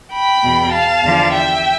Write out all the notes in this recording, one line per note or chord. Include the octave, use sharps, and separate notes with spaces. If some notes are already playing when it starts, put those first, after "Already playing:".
G5 B5
E2 B2
F5 A5
E2 D3 F3
E5 G5